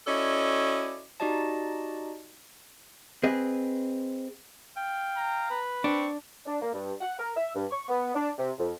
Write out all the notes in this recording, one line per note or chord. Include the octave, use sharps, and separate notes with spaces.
C#4 E4 F#4 A4 D5 D#5
D#4 F#4 G4 D5 D#5 A5
C4 G#4 B4 D#5
F5 G5
A#5
B4
C4 D4 C#6
D4
A#3
G2
F#5
A#4
E5
G2
C#6
B3
D4
C3
F2